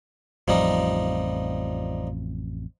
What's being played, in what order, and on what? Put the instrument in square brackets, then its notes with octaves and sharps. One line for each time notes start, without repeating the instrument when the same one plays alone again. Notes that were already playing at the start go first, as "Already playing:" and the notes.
[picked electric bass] A1 F2 [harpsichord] F3 G3 D#4